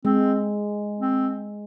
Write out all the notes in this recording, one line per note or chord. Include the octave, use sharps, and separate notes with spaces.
G#3 C4
C4